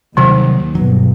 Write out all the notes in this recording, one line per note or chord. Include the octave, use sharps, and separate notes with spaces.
D#2 C3 D#3 F#3 G3
G2 B2 F#3